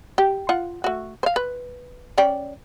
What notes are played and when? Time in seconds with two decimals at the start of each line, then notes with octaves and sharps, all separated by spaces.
0.18 G4
0.49 F4 F#5
0.84 A3 F#4
1.23 C5 F5
1.36 B4
2.18 C#4 D5 G5